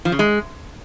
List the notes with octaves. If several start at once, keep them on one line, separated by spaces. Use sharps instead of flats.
F3
C#3
G#3